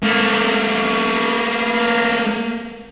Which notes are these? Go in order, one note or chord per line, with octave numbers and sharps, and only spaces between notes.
A3 A#3